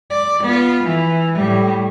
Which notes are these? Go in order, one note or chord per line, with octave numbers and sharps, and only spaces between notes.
D5
B3 F4
E3
A2 G3